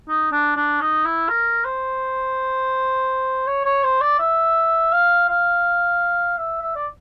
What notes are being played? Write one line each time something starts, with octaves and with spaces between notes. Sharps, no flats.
D#4
D4
D4
D#4
E4
A#4
C5
C#5
C#5
C5
D5
E5
F5
F5
E5
E5
D5